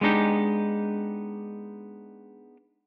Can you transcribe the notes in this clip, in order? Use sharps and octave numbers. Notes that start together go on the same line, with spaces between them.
G#3 B3 D4 D#4 G4